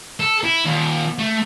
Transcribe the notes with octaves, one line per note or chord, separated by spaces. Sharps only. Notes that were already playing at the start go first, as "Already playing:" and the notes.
A4
E4
D#2 A#2
A3